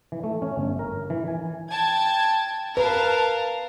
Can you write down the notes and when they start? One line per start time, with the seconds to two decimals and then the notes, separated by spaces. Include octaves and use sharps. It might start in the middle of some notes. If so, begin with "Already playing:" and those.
0.12 E3
0.24 A3
0.42 C#4
0.57 G1
0.79 A#4
1.10 E3
1.28 G#5
1.69 G5 A5 G#6
2.77 A#4 B4 F5 A5